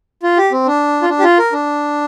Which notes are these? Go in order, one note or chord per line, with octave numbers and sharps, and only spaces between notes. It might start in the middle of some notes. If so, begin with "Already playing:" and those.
F4
G4
C4
D4
F4
D4
G4
F4
A#4
D4